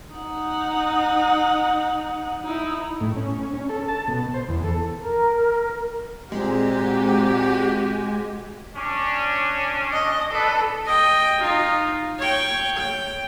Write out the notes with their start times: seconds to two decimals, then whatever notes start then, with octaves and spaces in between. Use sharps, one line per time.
0.14 D#4 F#5
2.43 D#4 E4
3.00 A2
3.16 C#4
3.54 C#4
3.69 A4
3.88 A5
4.08 B2
4.34 C5
4.48 E2
4.64 A4
5.00 A#4
6.32 A#2 G#3 C4 F#4 G4
8.76 C#4 D4
9.93 D#5
10.32 D4 A4 B4
10.86 D#5 G5
11.41 D#4 F4
12.19 C#5 G5
12.78 G5